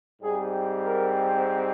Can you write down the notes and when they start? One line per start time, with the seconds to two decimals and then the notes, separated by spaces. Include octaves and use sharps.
0.21 G#2 G3 C4 G#4
0.86 A#4